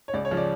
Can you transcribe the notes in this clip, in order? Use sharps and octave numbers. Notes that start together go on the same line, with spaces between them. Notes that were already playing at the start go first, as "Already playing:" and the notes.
C#5
C#2 D5
C#5
C#3 F3
D5